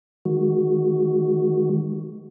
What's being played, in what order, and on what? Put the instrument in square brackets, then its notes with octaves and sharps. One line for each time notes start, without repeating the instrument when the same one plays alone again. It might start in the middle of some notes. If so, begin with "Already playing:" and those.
[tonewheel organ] D#3 G#3 F#4